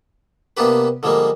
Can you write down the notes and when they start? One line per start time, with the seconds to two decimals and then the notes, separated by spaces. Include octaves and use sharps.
0.57 C3 A#3 B3 D4 G4 B4
1.03 D3 F3 G3 G#3 A#3